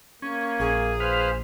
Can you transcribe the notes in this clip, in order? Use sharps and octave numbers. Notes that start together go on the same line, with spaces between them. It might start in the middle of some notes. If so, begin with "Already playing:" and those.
A#3 C#4
A#1 G#4
B4 C5 F5